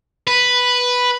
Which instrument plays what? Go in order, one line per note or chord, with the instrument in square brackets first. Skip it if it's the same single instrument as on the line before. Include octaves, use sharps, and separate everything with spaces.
[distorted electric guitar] B4